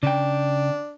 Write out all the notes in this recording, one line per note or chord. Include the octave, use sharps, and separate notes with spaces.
C#3 D4 G5